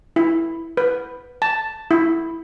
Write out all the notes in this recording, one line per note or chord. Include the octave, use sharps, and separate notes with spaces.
E4
B4
A5
E4